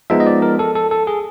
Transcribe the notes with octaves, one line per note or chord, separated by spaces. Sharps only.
F3 G#3 B3 D#4 E5
D#5
D5
A#4
A4
A4
A4
G#4